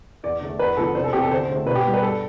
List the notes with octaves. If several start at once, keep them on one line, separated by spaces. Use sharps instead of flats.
E2 D5
D3 A3
E2 B4
D3 F3 B3 A4
C2 C5
A4
C3 E3 B3 G4
A4
D2 C5
D3 A3 C4
B2 B4
G4
G3 B3
B4
G2 A4